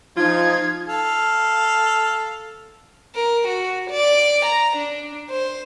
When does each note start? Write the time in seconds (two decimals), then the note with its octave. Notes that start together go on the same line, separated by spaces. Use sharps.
0.17 F3 D#4 F4 G#6
0.88 A4 F5
3.16 A#4
3.48 F#4
3.90 D5
4.46 A#5
4.77 D4
5.30 C5